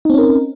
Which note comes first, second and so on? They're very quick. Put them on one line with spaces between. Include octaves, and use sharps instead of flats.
D#4 C4 C#4 A#4